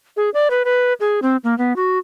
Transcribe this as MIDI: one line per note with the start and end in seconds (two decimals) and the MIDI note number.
0.17 0.30 68
0.34 0.48 74
0.51 0.63 71
0.65 0.93 71
1.00 1.20 68
1.22 1.37 60
1.44 1.57 58
1.58 1.76 59
1.76 1.98 66